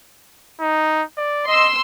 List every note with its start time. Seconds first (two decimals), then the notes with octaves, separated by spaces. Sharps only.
0.60 D#4
1.17 D5
1.47 D#5 C6 E6